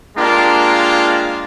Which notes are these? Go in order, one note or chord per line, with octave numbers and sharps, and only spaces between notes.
G#3 A#3 D4 F4 G4 A#4